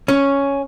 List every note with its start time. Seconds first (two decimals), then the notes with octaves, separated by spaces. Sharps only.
0.08 C#4